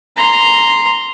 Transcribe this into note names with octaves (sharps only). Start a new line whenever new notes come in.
A#5 C6